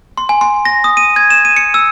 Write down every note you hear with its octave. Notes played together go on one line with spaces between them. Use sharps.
C6
G#5
C6
A#6
D#6
D#7
G#6
E7
D#7
C#7
E6